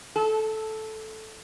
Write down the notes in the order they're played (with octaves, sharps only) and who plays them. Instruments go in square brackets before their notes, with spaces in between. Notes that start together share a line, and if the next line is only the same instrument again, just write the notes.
[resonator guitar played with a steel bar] A4